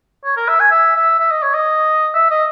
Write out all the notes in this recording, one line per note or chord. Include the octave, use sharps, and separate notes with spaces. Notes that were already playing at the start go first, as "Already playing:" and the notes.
C#5
A#4
E5
G#5
E5
E5
E5
D#5
C#5
D#5
E5
D#5